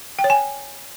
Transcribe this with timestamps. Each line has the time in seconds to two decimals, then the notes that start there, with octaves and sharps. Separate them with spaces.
0.19 G5
0.24 C#5
0.30 G#5